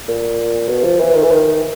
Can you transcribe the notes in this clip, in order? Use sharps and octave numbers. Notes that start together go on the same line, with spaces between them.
A#2
B2
F3
E3
D#3
E3
D#3